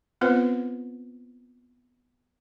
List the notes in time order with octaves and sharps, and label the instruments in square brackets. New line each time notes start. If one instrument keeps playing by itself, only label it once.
[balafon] B3 C4 F4 B4 C5